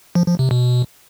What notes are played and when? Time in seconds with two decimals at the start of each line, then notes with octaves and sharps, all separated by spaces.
0.15 F3
0.27 F3
0.39 C3
0.51 B2